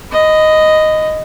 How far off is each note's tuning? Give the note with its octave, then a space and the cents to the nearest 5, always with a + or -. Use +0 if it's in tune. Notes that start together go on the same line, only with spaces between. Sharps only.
D#5 +0 B5 +30